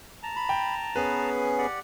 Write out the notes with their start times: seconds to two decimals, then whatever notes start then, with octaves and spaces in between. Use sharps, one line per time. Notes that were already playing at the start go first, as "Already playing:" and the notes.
0.23 A5 A#5
0.36 B5
0.49 G5
0.96 B3 C#4 G#4 B4
1.58 G4 D5 F#5